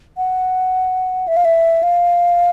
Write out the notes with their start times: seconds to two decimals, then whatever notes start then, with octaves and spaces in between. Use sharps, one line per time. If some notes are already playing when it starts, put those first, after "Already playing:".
0.17 F#5
1.28 E5
1.37 F5
1.45 E5
1.83 F5